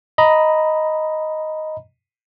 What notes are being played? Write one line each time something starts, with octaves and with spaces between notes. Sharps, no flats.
D#5 A#5 B5